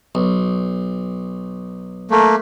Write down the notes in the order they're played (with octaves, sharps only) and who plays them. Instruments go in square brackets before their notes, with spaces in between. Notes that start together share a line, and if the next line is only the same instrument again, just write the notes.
[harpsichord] B1
[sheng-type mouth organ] A3 A#3